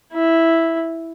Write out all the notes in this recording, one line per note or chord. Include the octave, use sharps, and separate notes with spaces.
E4